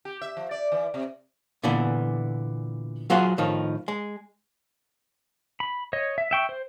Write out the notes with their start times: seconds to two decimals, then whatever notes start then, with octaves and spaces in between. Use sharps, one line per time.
0.05 G4
0.22 E5
0.37 F3
0.51 D5
0.72 E3
0.94 C3
1.64 A#2 D3 E3 B3
3.10 F#3 F4 F#4 G#4 C5 F#5
3.38 A2 D#3 F3 D#4
3.88 G#3
5.60 B5
5.93 C#5 D#5
6.18 E5
6.31 E5 G5 C#6
6.49 C5